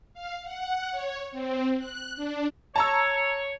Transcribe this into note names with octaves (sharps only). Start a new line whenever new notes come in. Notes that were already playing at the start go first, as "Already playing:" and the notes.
F5
F#5
C#5
C4
F#6
D4
C#5 A5 A#5 E6